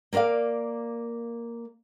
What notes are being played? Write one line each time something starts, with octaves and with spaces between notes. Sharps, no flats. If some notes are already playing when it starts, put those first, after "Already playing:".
A#3 A#4 B4 D5 F5